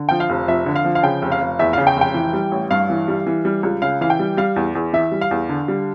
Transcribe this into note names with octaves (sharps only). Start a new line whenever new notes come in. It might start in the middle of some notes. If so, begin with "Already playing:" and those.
Already playing: D3
F3 G5
F5
F1
F2 E5
D3
F5
F3
F5
C#3 G5
F1
F5
F1
E2 E5
C#3 F5
G5
F1 G5
E3
G3
A1
G2 F5
E3
G3
E3
G3
C#2
C#3 F5
E3 F5
G5
G3
G3 F5
E2
E2
E3 E5
G3
F5
E2
D3
G3